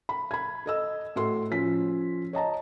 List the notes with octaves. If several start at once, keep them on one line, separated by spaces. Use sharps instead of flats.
B5
B5 G#6
A4 D#5 E6
A2 F#4 A4 C6
F3 C#4 B6
C#5 D#5 A5 A#5